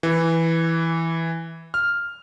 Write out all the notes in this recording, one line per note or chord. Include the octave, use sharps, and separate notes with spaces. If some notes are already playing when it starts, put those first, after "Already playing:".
E3
F6